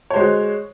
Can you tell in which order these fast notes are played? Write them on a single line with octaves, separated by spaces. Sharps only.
C#5 C5 G#3 F#4